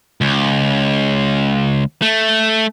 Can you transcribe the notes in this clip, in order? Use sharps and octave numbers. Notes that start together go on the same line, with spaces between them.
C#2
A3